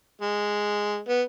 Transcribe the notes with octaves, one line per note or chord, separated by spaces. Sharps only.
G#3
B3